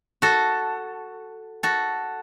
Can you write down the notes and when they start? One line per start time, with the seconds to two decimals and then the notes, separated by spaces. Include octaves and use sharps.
0.22 F#4 A4
1.63 F#4 A4